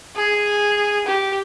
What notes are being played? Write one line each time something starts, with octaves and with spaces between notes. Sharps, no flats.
G#4
G4